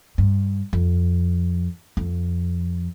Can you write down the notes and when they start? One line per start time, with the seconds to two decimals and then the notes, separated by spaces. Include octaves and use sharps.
0.18 G2
0.73 F2
1.97 F2